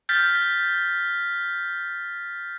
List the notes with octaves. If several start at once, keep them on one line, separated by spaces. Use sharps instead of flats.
F6 G6 A6 B6